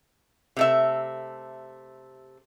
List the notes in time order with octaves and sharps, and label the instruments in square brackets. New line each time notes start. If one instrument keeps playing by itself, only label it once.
[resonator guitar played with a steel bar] C3 A3 E5